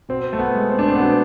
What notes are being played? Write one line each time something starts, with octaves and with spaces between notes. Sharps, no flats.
B2 C4
A3
B3
G#3
C4
D4
C4
B3
B2 C4